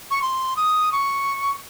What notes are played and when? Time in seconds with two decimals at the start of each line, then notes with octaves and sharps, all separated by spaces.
0.11 C#6
0.22 C6
0.57 D#6
0.92 C#6